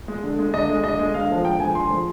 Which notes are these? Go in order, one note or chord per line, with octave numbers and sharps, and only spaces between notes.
G#3
D3
G#3
D3 D#5
G#3
D3 D#5
G#3
D3 F5
F3 G#3
D3 G5
F3 G#3 G#5
D3 C6
F3 G#3